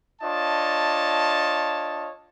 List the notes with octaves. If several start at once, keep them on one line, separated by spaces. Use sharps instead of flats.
D4 F4 C#5 D#5 A5